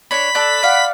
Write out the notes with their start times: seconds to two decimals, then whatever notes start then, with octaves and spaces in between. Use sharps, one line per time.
0.11 D4 C#5 B5 B6
0.35 A4 D5 F#6
0.63 D5 F5 F#5